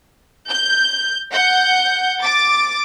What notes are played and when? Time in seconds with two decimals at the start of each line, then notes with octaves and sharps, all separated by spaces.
0.50 G6
1.32 F#5 G6
2.20 D6 A6